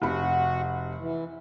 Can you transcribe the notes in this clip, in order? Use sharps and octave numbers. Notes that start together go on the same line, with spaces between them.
F1 C3 F#4 F#5 B5
E3